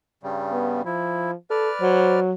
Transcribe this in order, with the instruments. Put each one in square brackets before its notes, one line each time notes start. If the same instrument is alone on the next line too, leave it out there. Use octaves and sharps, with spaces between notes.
[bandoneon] G2 C#3 G3
[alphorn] B3
[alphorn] F3 [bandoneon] E4
[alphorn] A4 [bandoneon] B4 D5 F6
[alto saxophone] F#3 [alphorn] C5